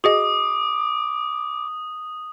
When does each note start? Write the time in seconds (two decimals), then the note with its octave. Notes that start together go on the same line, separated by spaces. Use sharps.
0.04 F#4 G#4 D#5 D6 D#6